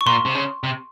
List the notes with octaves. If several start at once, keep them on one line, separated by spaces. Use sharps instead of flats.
C#6
A#2 C6
C3
C#3
C3